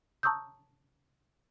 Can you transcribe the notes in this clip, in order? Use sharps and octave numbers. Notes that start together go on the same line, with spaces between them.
A5 A#5 C#6 D#6 E6 G6